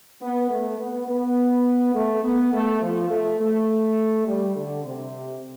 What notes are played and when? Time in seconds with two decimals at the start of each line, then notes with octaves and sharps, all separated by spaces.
0.22 B3
0.50 A3
0.79 B3
1.08 B3
1.95 A3
2.24 B3
2.53 A3
2.82 F3
3.11 A3
3.40 A3
4.27 G3
4.56 D3
4.85 C3